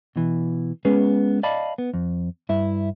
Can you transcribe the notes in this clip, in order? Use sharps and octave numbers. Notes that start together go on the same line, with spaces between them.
B2 E3
G#3 B3 C#4 G#4 B4
D5 D#5 F5 A5 B5
B3
F2
G2 E4 E5